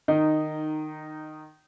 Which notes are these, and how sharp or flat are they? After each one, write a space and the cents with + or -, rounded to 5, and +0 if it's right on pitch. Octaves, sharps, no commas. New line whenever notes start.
D#3 -15 D#4 -5